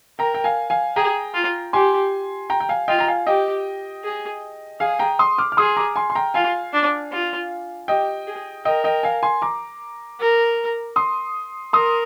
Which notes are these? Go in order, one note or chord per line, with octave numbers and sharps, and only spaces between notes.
A#4 G5 A#5
G5
F5 G#5
F5 G#5
G#4 G5 A#5
F4
G4 G#5 C6
G5 A#5
G5
F5 G#5
F4 D#5 G5
A#5
F5 G#5
G4 D#5 G5
G#4
G#4 F5 G#5
G5 A#5
C6 D#6
D6 F6
F6
G#4 C6 D#6
A#5 D6
G#5 C6
C6
G5 A#5
F4 F5 G#5
D4
F4
G4 D#5 G5
G#4
A#4 D#5 G5
D#5 G5
F5 G#5
G#5 C6
A#5 D6
A#4
C6 D#6
A#4 C6 D#6